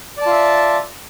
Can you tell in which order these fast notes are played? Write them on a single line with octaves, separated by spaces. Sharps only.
D5 A5 F4 E5